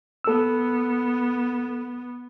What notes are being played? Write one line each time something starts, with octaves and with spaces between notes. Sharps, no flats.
B3 A4 E6